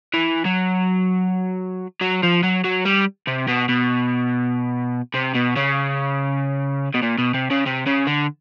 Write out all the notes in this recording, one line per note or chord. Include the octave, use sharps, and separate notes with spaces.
E3
F#3
F#3
F3
F#3
F#3
G3
C3
B2
B2
C3
B2
C#3
B2
A#2
B2
C3
C#3
C3
C#3
D3